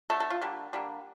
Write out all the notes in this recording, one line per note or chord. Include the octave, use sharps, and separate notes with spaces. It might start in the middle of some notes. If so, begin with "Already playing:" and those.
D3 A3 A4
A4
F4
D3 G3 A#3
D3 G3 A#3